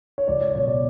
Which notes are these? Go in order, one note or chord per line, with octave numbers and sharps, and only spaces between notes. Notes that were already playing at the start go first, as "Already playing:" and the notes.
C#5
C#2 D5
C#5
B2 F#3 C#5
D5